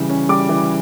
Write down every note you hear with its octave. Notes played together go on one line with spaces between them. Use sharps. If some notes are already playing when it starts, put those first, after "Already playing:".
Already playing: C#3 E3 G3
C#4
G3 D6
E3